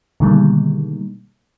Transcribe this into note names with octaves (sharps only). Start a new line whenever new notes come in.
B2 D3 D#3 G3 G#3 A#3